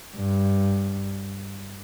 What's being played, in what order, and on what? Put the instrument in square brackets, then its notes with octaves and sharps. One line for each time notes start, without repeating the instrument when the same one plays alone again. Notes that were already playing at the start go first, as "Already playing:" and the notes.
[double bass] G2